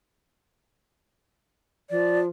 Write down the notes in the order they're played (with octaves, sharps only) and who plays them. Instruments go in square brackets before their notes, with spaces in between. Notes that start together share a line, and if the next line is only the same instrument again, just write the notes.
[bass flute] F3 [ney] D5